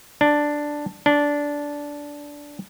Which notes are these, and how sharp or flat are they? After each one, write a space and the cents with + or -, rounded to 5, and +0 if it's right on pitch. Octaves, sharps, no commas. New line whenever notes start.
D4 +5
D4 -10